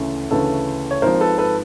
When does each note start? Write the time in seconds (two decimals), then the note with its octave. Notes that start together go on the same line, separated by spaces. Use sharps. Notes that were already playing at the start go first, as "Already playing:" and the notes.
Already playing: D2 C#3 E3 A3 C#4
0.30 D2 C#3 E3 A3 C#4 A4 B4
0.91 C#5
1.02 G#1 G#2 F3 A#4 C5
1.20 A4 B4
1.38 A4 B4